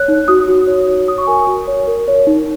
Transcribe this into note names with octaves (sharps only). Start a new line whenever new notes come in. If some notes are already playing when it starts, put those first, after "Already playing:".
Already playing: C#5 F#6
D#4
F#4 D#6
F#4
C#5
C#5
C#5 D#6
C#6
A#4 G#5
F#4
C#5
A#4
C#5
D#4